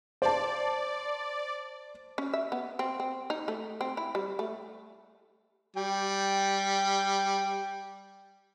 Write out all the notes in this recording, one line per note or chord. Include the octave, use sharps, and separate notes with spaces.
C5 D5 A5
C#4
E5
B3
C4
C4
D#4
A3
C4
E4
G3
A3
G3 G5